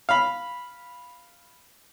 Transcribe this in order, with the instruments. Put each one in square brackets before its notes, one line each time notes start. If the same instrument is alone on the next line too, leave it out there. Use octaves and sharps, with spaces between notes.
[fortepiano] F5 B5